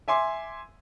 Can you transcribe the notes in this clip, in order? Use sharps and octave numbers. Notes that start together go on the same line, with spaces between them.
E5 G#5 C6 D6